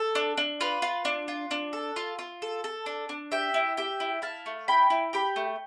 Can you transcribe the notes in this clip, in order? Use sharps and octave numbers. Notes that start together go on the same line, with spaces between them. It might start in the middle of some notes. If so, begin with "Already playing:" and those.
Already playing: A4
D4
D4
F4 B4
F4
D4
F4
D4
A4
F4
F4
A4
A4
D4
D4
G4 E5 G5
E4
G4 E5 G5
E4
E4 F5 A5
A3
E4 G5 B5
E4
G4 G5 B5
A3